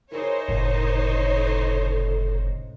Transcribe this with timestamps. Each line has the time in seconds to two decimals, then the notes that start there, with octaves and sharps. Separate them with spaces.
0.11 D#4 E4 G4 G#4 A#4 C5 C#5
0.48 F#1 C#2 A2 C3 A#4
1.35 A4